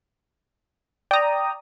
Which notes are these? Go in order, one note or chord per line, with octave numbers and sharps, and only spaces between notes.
D5 G5 A#5 D#6